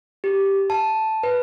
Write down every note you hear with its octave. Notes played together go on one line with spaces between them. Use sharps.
G4
A5
B4